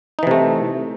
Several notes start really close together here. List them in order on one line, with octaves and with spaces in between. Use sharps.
D#4 E3 C3 A3